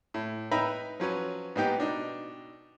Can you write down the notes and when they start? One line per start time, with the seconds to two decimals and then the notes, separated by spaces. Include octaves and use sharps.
0.14 A2
0.51 D#4 B4 E5 G5 A#5 B5
1.00 F3 F#3 C#4 B4
1.56 G#2 A#3 B3 D#4 G4 G5
1.78 B2 D4 D#4